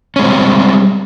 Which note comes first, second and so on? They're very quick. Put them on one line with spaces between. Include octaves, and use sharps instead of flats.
C#4 G#3 C4 G3